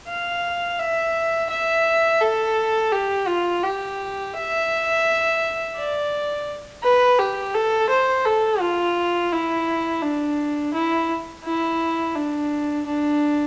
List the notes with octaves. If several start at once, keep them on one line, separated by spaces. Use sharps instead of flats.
F5
E5
E5
A4
G4
F4
G4
E5
D5
B4
G4
A4
C5
A4
F4
E4
D4
E4
E4
D4
D4